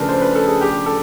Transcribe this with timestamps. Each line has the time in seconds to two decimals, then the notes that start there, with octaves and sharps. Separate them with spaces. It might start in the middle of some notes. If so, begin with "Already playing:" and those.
Already playing: C#3 F3 A3 D4 A#4 B4
0.09 C5
0.22 B4
0.35 A4
0.47 G#4
0.61 G4
0.86 A4